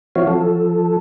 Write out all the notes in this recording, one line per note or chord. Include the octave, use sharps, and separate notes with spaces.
F3 C4 E4 F#4 C#5 F5
F3 A4